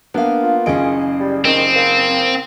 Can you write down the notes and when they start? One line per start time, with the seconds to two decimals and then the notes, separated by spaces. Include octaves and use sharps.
0.14 A#3 B3 D4 F5
0.43 F4
0.66 F#1 C#4 G#4 D#5 D7
1.20 G3
1.45 D#3 C4
1.76 A#3